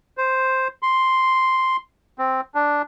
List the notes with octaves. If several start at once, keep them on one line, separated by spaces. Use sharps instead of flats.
C5
C6
C4
D4